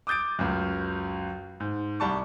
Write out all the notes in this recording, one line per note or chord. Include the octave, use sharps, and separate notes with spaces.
D6 D#6 G6 A6 D7
C#2 F#2
G#2
C2 G3 A5 C#6